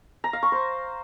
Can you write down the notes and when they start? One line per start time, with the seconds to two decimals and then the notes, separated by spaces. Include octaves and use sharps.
0.24 A#5
0.33 F5
0.43 C#6
0.52 C5